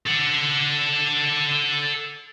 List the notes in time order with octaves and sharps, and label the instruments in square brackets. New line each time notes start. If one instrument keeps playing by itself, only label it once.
[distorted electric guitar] A4 F#5